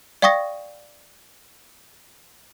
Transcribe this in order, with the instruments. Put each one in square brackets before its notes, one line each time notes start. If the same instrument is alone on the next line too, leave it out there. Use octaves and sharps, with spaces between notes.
[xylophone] D5 F5 G5 C#6 D#6 A#6